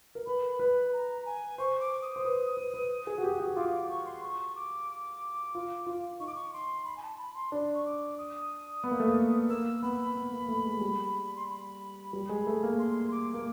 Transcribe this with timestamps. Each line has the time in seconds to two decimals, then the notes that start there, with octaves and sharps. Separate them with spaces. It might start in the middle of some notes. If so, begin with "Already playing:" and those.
0.15 A#4
0.26 B4 B5
0.59 B4
0.93 A#5
1.26 G#5
1.58 C5 C#6
1.80 D6
2.02 D#6
2.16 C5
2.24 B4 D#6
2.57 B4
2.74 B4
3.07 G#4
3.18 F#4
3.23 G4
3.40 F#4
3.56 F4 D6
3.68 D#6
3.72 D6
3.89 C#6
4.05 C6
4.23 C#6
4.56 D6
5.55 F4
5.86 F4
6.20 D#4 C#6
6.27 D6
6.35 C#6
6.53 C6
6.85 B5
6.97 G#5
7.03 A5
7.19 B5
7.35 C6
7.52 D4
7.74 C#6
7.85 D6
8.18 D#6
8.84 B3
8.91 A#3
9.00 A3
9.08 A#3
9.49 A#3 E6
9.82 B3 B5
10.15 B3
10.32 A#3
10.48 A3
10.65 G#3
10.77 G#3
10.81 G3
11.36 C6
11.47 B5
12.13 G3
12.29 G#3
12.47 A3
12.63 A#3
12.79 C6
13.12 D6
13.34 A#3